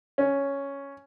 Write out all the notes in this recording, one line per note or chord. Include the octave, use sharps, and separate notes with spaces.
C#4